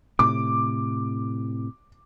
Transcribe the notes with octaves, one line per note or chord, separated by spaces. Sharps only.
A2 C3 D6